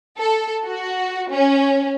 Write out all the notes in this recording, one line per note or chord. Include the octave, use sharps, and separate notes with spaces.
A4
F#4
C#4